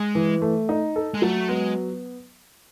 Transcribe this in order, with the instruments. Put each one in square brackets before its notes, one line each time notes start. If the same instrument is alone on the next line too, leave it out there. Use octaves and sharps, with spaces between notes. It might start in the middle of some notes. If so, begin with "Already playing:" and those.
Already playing: [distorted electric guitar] G#3
[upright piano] E3
A3
D#4
A4
[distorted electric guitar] G#3
[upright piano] F#3 [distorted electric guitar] A3
[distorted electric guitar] G#3 [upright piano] B3